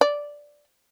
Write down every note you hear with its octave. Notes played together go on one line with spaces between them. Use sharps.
D5